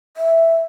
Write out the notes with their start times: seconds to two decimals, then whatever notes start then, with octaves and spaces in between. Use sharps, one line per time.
0.17 E5